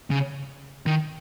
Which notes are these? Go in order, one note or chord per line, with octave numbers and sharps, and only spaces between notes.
C#3
D#3